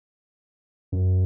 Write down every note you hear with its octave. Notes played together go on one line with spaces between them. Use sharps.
F#2